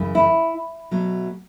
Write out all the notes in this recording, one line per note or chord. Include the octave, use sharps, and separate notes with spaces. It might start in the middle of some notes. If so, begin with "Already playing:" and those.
Already playing: F#2 C#3 E3
E4
B2 F#3 A3